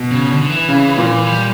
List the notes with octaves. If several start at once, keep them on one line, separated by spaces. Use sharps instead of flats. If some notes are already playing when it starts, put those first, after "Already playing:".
Already playing: B2
C#3
D3
D3
E3
C#3
A#2
G3